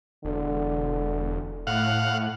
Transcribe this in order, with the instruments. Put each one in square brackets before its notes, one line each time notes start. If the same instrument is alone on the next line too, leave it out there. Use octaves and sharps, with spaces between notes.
[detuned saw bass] E1 [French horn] D3
[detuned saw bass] A2 [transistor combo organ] F5 F#5